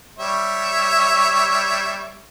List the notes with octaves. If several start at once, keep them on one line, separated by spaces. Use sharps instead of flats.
G3 C#5 E5